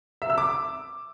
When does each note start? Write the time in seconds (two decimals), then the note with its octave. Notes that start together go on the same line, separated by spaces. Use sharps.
0.22 E5
0.30 E6
0.38 D6